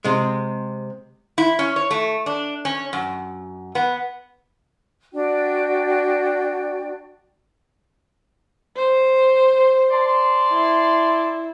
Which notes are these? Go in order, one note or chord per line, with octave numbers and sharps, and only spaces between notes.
C3 G#3
E4
C#4
C#5
A3
D4
C#4
F#2
B3
D4 F#4 D5 G5
C5
D5 A5 C6
E4